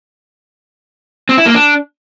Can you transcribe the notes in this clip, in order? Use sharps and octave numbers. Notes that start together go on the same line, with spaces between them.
C4
E4
A#3
D4